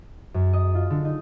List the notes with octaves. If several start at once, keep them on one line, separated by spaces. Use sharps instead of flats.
F#2
D#5
F4
D3
D#4